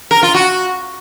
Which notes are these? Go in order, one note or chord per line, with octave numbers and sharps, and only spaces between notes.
A#4
F4
F#4